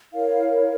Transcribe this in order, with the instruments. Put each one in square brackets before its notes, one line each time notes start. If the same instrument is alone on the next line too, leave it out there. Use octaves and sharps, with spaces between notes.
[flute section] E4 A#4 C#5 F5